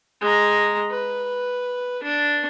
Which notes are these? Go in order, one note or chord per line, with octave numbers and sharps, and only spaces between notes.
G#3 A#5
B4
D4